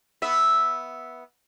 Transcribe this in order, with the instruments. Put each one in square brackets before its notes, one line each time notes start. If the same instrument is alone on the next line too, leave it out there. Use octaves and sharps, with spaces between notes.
[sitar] B3 E5